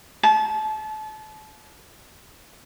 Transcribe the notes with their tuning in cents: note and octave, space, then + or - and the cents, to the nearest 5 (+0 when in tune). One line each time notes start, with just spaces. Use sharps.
A5 -30